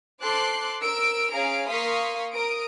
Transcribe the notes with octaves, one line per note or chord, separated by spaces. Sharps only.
A4 C5 A5 C6 D6 F#6
A#4 E6 D7
C#4 G#4 F5 A#5 D7
A#3 F5 C6 C#6 D#6 B6
A#4 D#6 D7